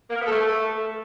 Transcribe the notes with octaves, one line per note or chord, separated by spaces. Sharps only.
A#3
A#4
B3
A4
A3